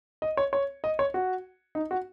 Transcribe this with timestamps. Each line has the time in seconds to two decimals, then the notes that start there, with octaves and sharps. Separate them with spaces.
0.22 D#5
0.37 C#5
0.53 C#5
0.84 D#5
0.99 C#5
1.14 F#4
1.75 D#4
1.91 F#4